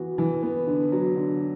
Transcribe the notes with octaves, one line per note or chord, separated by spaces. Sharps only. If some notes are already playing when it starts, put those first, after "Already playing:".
Already playing: E3 B3 F#4
E3
B3
D3
F#3
D3